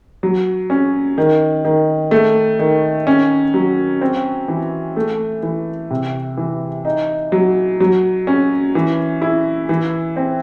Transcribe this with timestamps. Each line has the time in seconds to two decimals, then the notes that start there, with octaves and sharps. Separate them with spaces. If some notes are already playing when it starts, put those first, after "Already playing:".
0.23 F#3
0.70 C#4
1.18 D#3
1.65 D#3
2.11 A3
2.59 D#3
3.07 C#4
3.54 F#3
4.01 C4
4.48 E3
4.97 A3
5.43 E3
5.90 C3
6.37 E3
6.85 D#4
7.32 F#3
7.80 F#3
8.27 C#4
8.75 E3
9.22 E4
9.69 E3
10.16 C4